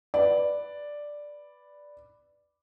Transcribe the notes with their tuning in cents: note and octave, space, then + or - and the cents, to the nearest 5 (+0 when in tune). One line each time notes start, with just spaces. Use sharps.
B4 +0 D5 +0